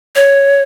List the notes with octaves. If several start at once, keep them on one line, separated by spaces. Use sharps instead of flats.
C#5